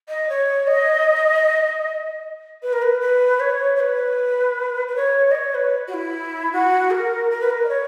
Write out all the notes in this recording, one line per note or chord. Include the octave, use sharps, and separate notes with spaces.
D#5
C#5
D#5
B4
A#4
B4
B4
C#5
C#5
B4
B4
C#5
D#5
C#5
B4
F#4
E4
F#4
A#4
A#4
B4
A#4
D#5
C#5